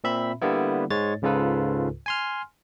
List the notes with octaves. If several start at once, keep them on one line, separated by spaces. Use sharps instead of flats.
A#2 C4 E5 B5
D3 G3 A#3 B3 E4
G#2 G#3 C#5 A6
C#2 G#2 C#3 F4 A4 B4
G#5 C6 F6